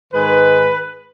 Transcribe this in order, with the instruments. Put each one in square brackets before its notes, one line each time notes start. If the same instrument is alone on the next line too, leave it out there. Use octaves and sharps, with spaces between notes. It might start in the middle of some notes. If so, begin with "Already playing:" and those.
[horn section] G#2 D#3 G#3 B4